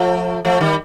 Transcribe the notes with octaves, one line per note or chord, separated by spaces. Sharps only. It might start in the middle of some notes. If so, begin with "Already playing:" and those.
Already playing: F3 A3
F3 A3
D#3 G3